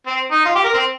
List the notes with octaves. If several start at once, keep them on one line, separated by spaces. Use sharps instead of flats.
C4
D#4
F4
G4
A#4
C4